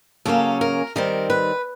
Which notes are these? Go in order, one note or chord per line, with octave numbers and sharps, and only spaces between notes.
C#3 F#3 A#3 C#4 A4
A#4
D#3 G3 C4 A#4
B4